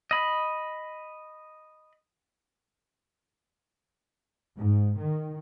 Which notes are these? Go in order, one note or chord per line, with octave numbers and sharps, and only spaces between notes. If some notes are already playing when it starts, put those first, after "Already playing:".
D#5 B5
G#2
D#3